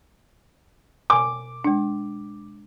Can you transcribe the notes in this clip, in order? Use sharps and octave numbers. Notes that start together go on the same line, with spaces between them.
B2 G#5 C6 D6
G#3 D4